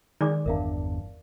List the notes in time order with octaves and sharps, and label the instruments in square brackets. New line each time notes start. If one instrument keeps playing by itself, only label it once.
[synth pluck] D#3 G#3 [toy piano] D5 D6
[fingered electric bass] G1 E2 D4 [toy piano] A#4 E5 F5